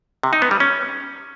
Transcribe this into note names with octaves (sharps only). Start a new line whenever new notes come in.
C3
D#4
B3
G3
C#4